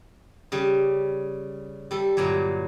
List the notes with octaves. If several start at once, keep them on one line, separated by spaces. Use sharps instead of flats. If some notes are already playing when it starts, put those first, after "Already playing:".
C#3 G3
G3 A4
G2 A#2 D3 F#3